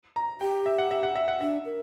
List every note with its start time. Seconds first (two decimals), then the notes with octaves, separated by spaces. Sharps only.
0.16 A#5
0.41 G4 G5
0.66 E5
0.78 F#5
0.91 E5
1.03 F#5
1.15 E5
1.28 F#5
1.41 D4 E5
1.65 A#4